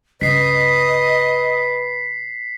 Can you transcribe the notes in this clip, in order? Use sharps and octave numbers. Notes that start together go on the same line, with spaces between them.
C#2 G2 B4 D#5 B6 C7